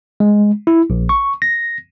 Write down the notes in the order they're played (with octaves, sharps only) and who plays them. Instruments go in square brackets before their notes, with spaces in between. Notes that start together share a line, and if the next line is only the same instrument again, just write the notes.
[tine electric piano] G#3
E4
A#1
C#6
A#6